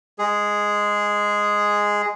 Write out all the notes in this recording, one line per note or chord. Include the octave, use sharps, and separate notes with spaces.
G#3 G#4